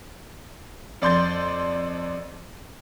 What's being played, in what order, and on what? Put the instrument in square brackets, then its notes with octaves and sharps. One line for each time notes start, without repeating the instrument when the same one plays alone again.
[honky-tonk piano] F2 D5 C6 G6 A6